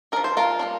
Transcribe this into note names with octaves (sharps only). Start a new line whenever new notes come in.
F3 D4 A#4
C5
F4 A#4
G3 A#3 D4